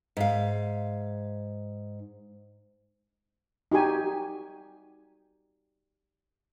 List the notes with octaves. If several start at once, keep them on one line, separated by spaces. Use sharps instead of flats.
G#2 F5
D#4 F#4 G4 G#5